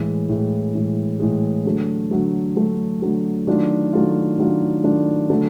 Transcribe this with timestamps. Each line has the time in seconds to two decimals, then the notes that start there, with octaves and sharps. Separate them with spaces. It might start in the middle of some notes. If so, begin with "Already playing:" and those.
Already playing: A2 E3 G#3
0.29 A2 E3 G#3
0.75 A2 E3 G#3
1.20 A2 E3 G#3
1.65 D3 F#3 A3
2.11 D3 F#3 A3
2.56 D3 F#3 A3
3.02 D3 F#3 A3
3.47 D#3 F#3 A3 D4 F4
3.93 D#3 F#3 A3 D4 F4
4.38 D#3 F#3 A3 D4 F4
4.84 D#3 F#3 A3 D4 F4
5.30 D3 F#3 A3